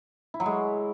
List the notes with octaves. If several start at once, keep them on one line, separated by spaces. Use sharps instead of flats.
E4
F#3
G#3